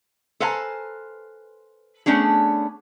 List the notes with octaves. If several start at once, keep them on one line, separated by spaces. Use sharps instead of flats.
A4 B4 C5 F5 G#5 A#5
A3 B3 C#4 D4 G#4